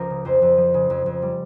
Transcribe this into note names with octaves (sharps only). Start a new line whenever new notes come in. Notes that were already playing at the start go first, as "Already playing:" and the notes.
Already playing: C#2 F3 A#4
C#3
F2 C5
F2
F3
C#3
F2
F2
G3